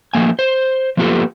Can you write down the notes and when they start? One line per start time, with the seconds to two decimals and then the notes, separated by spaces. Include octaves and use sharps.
0.14 F3 A3 A#3 G#5
0.39 C5
0.97 F3 A#3 B3 F4 G4 A4